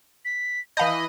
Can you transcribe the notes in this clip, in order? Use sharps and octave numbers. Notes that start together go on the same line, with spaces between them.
B6
E3 D#5 F5 A5 B5 G6